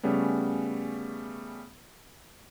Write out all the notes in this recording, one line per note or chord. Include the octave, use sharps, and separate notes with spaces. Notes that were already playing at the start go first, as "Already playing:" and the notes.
C#3 G3 A3 B3 C#4